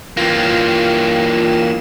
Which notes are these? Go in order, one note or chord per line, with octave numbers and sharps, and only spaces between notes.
E3 A#3 F4 G5 E7